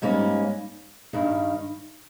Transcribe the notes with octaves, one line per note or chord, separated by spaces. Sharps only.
G#2 G3 A#3 C#4
G2 D#3 G3